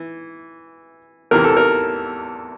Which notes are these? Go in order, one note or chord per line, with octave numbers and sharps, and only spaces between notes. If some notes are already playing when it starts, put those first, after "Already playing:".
Already playing: E3
E2 C3 E3 A#4
A4
A#4